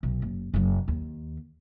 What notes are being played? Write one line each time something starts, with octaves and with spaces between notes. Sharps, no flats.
B1
F#1
F#1 F#3
D#2